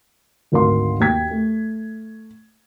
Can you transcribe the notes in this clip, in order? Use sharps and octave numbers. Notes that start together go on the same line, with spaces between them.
G#1 D2 A#4 F5 C6
D#2 G5 G#6 B6
A3